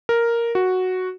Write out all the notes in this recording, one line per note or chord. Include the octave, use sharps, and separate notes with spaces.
A#4
F#4